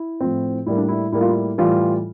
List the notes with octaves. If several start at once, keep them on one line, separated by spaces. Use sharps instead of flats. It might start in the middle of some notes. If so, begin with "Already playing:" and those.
Already playing: E4
A2 F3 C4
A2 G3 A#3 E4
D4
E4
A2 G3 A#3 E4
F4
E4
A2 E3 G3 F4